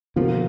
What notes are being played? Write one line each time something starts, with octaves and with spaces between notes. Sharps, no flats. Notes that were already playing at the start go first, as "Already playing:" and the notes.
B2 D3 F3 A#3 F4